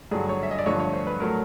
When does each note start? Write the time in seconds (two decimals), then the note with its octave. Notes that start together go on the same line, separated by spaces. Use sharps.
0.11 G2 D3 F#3 G#4
0.29 C#5
0.43 E5
0.51 D#5
0.58 D5
0.66 G2 D3 F3 A3 C#5
0.80 C#5
0.93 C5
1.07 B4
1.20 A2 F#3 A3 A#4